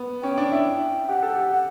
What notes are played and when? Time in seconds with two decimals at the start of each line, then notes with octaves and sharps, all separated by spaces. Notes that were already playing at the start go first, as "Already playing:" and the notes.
Already playing: B3
0.23 C#4 G5
0.38 D4
0.52 E4
1.09 G4 F#5
1.23 A4
1.36 G4
1.51 F#5